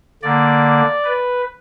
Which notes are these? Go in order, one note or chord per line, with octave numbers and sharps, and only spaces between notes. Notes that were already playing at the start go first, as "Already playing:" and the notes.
D3 A#3 D5
B4